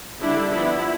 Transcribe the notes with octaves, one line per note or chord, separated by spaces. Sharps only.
D3 G3 D4 E4
F3 B3 D4 E4